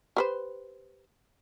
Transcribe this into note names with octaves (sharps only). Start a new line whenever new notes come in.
G4 B4 C5